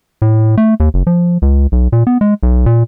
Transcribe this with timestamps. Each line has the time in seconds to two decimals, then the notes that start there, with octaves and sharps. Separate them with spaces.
0.22 A2
0.57 A3
0.80 D#2
0.94 F#1
1.07 F3
1.42 C#2
1.72 B1
1.92 A#2
2.07 B3
2.21 G#3
2.43 B1
2.66 A#2